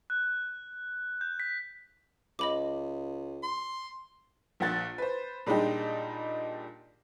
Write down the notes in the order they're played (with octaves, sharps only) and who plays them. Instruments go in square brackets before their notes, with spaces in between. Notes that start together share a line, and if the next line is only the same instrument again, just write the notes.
[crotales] F#6
G6
B6
[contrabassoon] C#2 [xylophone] D#5 B5 D6
[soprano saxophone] C6
[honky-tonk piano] A#1 A#2 F#5 A6
B4 C5
A#2 G3 G#3 D4 D#4 G4